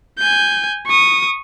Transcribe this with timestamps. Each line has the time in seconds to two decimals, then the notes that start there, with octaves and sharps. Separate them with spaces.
0.18 G#5 G6
0.87 C#6 D#6